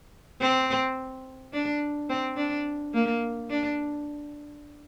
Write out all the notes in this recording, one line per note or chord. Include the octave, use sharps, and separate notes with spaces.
C4
D4
C4
D4
A#3
D4